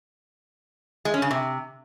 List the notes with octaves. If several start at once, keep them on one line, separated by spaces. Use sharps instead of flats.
G#3
C#4
C#3
C3